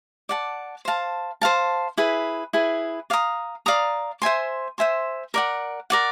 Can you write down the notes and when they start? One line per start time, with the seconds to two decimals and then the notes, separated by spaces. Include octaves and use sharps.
0.29 D5 F#5 A5
0.85 C5 F5 A5
1.41 C5 F5 A5
1.97 E4 G#4 B4
2.53 E4 G#4 B4
3.10 D5 F5 A#5 D#6
3.66 D5 F5 A#5 D#6
4.22 C5 E5 G#5 C6
4.78 C5 E5 G#5 C6
5.34 A#4 D5 F#5
5.90 A#4 D5 F#5